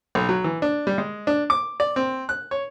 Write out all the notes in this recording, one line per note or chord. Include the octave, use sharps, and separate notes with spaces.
B1
F#3
E3
D4
G3
G#3
D4
D6
D5
C4
F#6
C#5